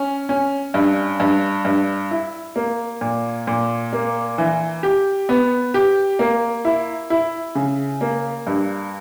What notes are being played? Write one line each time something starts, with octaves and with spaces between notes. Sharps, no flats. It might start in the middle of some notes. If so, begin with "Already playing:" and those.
Already playing: C#4
C#4
G2
G2
G2
E4
A#3
A#2
A#2
A#3
E3
G4
B3
G4
A#3
E4
E4
C#3
A#3
G2